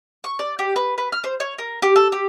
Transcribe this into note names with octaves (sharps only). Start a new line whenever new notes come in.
C#6
D5
G4
B4
B4
F6
C5
C#5
A#4
G4
A4
G4